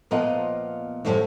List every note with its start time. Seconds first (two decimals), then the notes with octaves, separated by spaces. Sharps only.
0.11 A#2 F3 B3 F4 D#5 F#5
1.05 F#2 A2 F3 G3 C#4